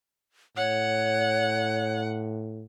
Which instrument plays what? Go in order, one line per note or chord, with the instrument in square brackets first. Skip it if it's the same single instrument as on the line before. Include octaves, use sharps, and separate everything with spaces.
[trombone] A2 [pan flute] C#5 [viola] F#5